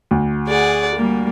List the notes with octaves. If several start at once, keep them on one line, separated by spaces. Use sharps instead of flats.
D2
G#4 D5 F#5
G3 A#3